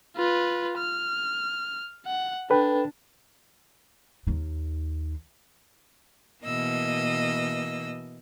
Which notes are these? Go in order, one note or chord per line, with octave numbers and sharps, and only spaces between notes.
F4 B4
F6
F#5
D4 A4 B4 G5
D#2 D#3
B2 E3 A#3 D#5 E6